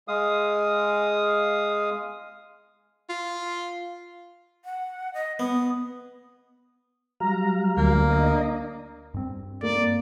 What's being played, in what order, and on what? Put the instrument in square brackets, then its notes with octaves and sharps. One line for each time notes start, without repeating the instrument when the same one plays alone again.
[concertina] G#3 F5 D#6
[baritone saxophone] F4
[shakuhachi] F#5
D#5
[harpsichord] B3 [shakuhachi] D#6
[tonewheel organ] F#3 G3 F5 [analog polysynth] A#5
[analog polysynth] D2 [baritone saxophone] A#3
[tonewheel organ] D4 D#5 A#5
[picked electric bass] G2 C4
[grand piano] A#3 [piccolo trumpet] D5